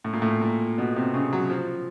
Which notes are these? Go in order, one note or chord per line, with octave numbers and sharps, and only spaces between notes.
A2
A#2
A2
A#2
B2
C3
C#3
F#3
F3